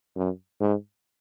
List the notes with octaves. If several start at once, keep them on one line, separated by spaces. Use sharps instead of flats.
F#2
G#2